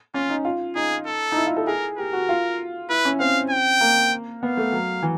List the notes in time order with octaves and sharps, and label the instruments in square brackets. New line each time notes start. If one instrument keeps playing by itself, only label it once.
[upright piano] C#4 [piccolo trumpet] F4
[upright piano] D#4
F4
[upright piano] D#4 [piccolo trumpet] G#4
[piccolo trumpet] A4
[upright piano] D#4
E4
F4
A4
[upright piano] G#4 [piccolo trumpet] A#4
[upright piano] G4 [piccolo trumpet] A#4
[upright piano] F#4
F4
[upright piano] E4 [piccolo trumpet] B4
[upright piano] C#4
[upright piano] C4 [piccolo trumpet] F5
[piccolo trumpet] G5
[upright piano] A#3
[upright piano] B3 [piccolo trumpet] F5
[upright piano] A3
F#3
E3